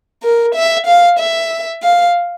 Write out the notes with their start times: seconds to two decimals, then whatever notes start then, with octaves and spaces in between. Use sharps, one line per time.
0.23 A#4
0.55 E5
0.87 F5
1.19 E5
1.83 F5